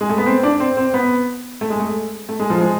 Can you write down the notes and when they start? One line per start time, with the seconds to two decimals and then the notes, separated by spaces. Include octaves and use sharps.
0.01 G#3
0.09 A3
0.18 B3
0.26 C4
0.43 D4
0.60 C4
0.77 C4
0.94 B3
1.61 A3
1.70 G#3
1.80 A3
2.29 A3
2.40 G#3
2.50 F3
2.61 G#3